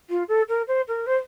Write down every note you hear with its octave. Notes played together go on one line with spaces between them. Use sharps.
F4
A4
A#4
C5
A#4
C5